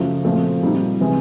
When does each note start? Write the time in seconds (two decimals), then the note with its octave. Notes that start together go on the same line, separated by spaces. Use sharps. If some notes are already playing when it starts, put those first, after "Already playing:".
Already playing: F#2 C#3 F3 A3
0.24 A#2 F3 A3 C4
0.62 A#2 G3 C4 D#4
1.00 C3 E3 G#3 C4